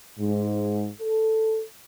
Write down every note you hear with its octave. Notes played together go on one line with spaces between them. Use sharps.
G#2
A4